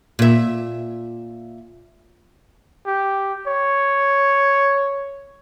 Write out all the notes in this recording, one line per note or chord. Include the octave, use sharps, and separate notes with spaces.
A#2 E5
G4
C#5